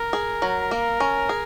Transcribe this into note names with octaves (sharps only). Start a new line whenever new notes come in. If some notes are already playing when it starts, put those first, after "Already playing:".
Already playing: A#4
G#4
F#3
A#3
C#4
G#4